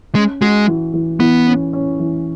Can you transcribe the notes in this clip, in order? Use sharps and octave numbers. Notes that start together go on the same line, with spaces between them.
G#3 C#4
G#3 F#4
E3
E3
E3 B3
C#4
C#4
E3